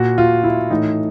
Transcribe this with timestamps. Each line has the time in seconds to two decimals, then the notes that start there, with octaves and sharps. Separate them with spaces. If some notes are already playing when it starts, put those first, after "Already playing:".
Already playing: A#2 F#4
0.18 F4
0.44 E4
0.70 A2 E3 D#4